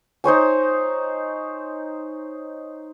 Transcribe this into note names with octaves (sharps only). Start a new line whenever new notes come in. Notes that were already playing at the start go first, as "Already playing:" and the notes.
D#4 C5 C#5 G#5